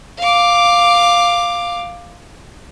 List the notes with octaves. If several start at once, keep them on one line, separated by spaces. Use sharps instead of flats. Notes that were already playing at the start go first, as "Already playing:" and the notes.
F5 D6